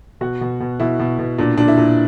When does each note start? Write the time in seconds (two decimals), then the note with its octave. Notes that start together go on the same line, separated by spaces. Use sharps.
0.21 B2 F#4
0.41 B2
0.60 B2
0.80 B2 E4
0.99 B2
1.19 B2
1.38 A#2 D4
1.58 A#2 D4
1.68 E4
1.77 A#2